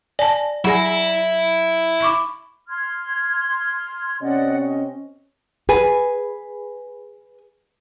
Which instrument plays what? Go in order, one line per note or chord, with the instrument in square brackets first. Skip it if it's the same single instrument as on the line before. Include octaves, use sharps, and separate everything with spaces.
[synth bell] D5 [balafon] G#5 A5
[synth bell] F#3 G#4 A#6 [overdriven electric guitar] E4 [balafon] F#5 G#5
[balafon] B5 C#6 D6
[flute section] C6 F6 G#6
[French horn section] C3 C4 C#4 [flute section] D5 D#5 F#5
[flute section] D#5
[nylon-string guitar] G#4 B4 G#5